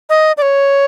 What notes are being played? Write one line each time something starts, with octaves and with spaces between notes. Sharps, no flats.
D#5
D5
C#5